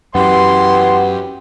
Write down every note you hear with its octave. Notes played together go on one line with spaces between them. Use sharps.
F#2 E3 B3 G4 C6